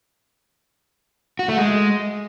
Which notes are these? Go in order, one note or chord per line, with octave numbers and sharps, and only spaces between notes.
F#4
A3
G#3